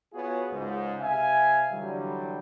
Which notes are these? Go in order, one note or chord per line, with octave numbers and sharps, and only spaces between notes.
B3 F4 F#4 G#4 C#5
C#2 G#2
C3 E5 F5 G#5
D3 E3 F#3 G3